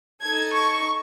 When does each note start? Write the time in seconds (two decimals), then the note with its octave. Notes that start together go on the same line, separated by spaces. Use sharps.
0.23 D#4 A4 G#6
0.54 C#6